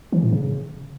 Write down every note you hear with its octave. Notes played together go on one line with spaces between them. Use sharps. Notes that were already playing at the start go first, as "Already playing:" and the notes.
E3
A2
C#3